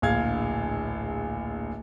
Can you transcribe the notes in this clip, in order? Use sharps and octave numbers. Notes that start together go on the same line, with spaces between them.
D1 A#1 F5 G#6